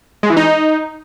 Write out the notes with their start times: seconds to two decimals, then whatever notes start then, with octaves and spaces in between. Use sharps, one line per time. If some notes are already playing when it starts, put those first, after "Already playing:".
0.23 G#3
0.30 E3
0.37 D#4